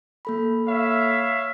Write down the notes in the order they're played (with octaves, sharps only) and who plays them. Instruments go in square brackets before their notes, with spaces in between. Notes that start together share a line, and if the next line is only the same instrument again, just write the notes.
[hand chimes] A#3 A4 B5
[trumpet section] C#5 E5 F5